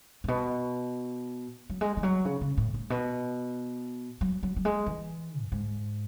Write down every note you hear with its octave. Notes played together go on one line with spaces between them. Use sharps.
A2
B2
F#3
G#3
E3
F#3
C#3
C#3
A2
A2
B2
F#3
F#3
F#3
G#3
E3
F#2
G#2